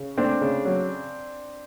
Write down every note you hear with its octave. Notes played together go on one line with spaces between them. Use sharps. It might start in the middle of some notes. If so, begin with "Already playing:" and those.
Already playing: C#3
A3 C4 D4
C#3
F#3